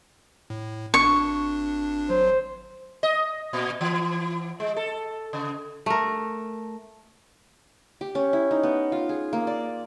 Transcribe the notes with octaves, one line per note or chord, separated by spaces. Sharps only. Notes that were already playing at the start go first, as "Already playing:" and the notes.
A2
G#1 D4 C#6
G#1 F#3 C5
D#5
A#2
E3
G#3
A4
C#3
A3 A#4
G4
C#4
E4
D#4
B3
F4
G#4
A#3
D5